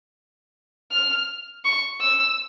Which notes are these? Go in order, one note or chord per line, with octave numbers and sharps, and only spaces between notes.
F6
C#6
E6